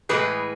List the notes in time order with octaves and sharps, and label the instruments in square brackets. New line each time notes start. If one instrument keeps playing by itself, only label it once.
[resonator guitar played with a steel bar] A2 E3 G#3 G#4 B4